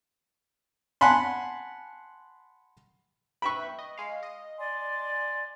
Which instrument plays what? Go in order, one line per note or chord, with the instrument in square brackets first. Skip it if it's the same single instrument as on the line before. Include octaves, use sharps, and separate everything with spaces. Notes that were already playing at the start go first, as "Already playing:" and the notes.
[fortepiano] F#5 G#5 A5 B5 C6
[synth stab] B4 E5 G5 [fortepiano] B5 C#6
[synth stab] D#5
G#3 F5
D#5
[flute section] D5 G#5 C6